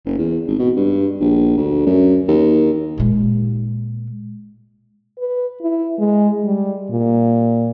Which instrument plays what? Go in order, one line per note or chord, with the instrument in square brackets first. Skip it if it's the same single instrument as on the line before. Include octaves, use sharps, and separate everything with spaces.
[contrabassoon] F#1
E2
G#1
B2
G2
A#1
D2
F#2
D#2
[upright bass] A#2 G#3
[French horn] B4
E4
G#3
G3
A#2